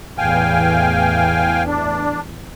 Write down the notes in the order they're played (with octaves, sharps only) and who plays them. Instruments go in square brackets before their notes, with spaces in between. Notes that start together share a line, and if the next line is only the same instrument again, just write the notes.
[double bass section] E2 A2 E3 [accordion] F5 G5 G#5
[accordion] D4